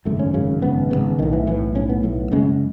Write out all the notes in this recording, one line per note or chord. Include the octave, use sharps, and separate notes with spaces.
G#1 F#2 C#3 A3
C#4
G#1 F#2 C#3
G#1 F#2 C#3 B3
G#1 F#2 C#3 B3
B1 A2 D#3
E3
B1 A2 E3
B1 A2 C#4
B3
B1 A2
F#1 F#2 C#3 G#3